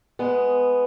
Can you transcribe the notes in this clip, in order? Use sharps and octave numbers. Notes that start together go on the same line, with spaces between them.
G#3 B3